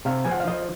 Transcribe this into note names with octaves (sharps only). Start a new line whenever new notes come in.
C3 F5
F3 G#5
F#5
F5
F3 D#5